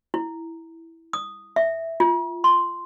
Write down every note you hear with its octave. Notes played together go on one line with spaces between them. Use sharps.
E4
D#6
E5
F4
C6